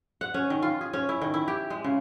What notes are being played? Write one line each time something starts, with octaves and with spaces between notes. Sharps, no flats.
F#5
C#4
D#3
F4
G#4
C#4
E4
D#3
E4
G4
G#3
C#3